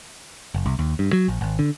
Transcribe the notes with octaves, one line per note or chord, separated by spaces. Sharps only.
F#1
C2
D#2
G2
F#3
A#1
G#1
D3